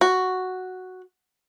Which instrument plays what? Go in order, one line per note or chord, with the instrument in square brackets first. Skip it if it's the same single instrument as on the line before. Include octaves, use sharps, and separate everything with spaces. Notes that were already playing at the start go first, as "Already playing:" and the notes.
[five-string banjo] F#4